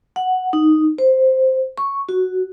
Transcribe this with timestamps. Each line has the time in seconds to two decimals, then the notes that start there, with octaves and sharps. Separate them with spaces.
0.16 F#5
0.53 D#4
0.98 C5
1.78 C#6
2.09 F#4